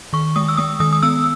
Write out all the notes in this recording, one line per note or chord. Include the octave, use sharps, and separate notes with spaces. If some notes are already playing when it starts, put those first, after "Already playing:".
D#3 C#6
G#3 D#6
E6
G#3 D#6
D#3 D#6
D#6
B3 E6